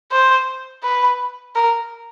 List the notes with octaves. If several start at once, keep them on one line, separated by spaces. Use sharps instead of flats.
C5
B4
A#4